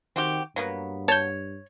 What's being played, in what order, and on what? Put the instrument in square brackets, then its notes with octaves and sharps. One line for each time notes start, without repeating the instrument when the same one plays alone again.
[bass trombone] D#3 [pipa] C4 F#4 G4
[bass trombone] G2 [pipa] F#3 A#3 B3
[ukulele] C#5 [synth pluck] A5 G6